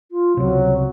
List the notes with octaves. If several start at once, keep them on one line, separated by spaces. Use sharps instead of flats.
F4
C#2 C3 F#3